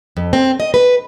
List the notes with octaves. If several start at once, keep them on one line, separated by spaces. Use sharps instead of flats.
F2
C4
D#5
B4